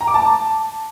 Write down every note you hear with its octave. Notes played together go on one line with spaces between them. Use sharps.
A#5
D6
A5